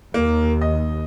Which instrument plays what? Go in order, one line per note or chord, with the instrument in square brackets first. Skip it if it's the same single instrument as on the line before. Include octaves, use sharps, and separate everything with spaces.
[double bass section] D#2 [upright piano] A#3
[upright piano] D#5